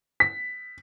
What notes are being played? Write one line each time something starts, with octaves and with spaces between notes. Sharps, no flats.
B6